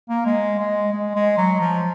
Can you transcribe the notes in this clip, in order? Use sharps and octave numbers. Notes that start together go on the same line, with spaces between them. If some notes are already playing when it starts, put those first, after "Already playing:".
A#3
G#3
G#3
G#3
G#3
F#3
F3